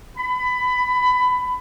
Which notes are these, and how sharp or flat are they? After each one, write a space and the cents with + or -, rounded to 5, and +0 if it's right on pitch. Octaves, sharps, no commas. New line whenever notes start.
B5 +20